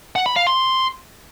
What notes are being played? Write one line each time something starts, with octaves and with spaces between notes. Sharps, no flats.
F#5
B5
F5
C6